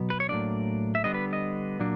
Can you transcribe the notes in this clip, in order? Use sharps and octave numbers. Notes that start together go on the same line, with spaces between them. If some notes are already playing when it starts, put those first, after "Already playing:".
Already playing: B2 F#3 B3
B4
C#5
A2 F#3 A#3 D4 D5
E5
D3 G3 B3 D4 D#5
B4
D#5
A#2 F#3 A#3 D4